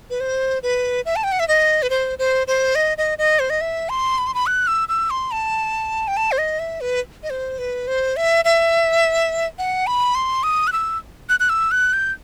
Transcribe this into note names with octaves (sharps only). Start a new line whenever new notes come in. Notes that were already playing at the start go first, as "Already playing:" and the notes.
B4
C5
B4
E5
A5
G5
F#5
E5
D#5
B4
C5
C5
C5
D#5
D#5
D#5
C5
D#5
E5
C6
B5
C6
B5
F#6
E6
E6
C6
A5
G5
A5
C5
D#5
E5
B4
D#5
C5
B4
C5
E5
E5
F#5
B5
C6
D#6
F#6
E6
F#6
F#6
E6
F#6
G6